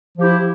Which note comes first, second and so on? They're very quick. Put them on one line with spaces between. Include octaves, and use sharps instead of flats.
F3 G4 E4